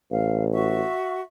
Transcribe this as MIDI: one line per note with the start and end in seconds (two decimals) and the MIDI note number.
0.11 0.82 33
0.11 0.45 77
0.52 1.21 66
0.52 1.21 76
0.52 1.21 85